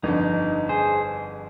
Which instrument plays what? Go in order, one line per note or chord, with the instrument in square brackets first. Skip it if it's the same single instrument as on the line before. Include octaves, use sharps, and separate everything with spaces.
[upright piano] G1 F2 D3 [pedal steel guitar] D#4
[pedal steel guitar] G#4 C5